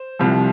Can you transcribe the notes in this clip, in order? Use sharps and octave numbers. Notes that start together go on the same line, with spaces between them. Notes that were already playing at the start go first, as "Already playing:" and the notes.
Already playing: C5
C2 C3 F3